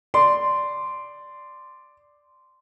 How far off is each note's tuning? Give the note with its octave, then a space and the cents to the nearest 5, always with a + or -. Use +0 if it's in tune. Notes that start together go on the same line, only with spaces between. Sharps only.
D5 +0 C6 -10